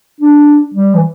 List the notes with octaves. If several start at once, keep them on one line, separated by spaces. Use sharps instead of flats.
D4
G3
E3